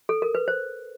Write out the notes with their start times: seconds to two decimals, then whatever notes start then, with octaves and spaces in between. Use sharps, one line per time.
0.09 A4
0.22 A#4
0.35 B4
0.48 C5